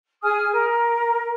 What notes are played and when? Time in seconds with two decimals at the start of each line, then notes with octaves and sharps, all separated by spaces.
0.23 G#4 G#5 D#6 F6
0.51 A#4